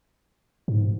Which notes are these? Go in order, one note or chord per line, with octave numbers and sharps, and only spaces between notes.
G#2